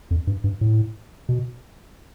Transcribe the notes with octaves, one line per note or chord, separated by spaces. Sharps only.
F2
G2
G2
A2
B2